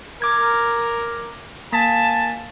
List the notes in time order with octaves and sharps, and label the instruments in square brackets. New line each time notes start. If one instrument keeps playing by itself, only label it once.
[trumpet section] A#4 [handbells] D6 G#6
[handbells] A#3 B6 [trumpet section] G#5 A5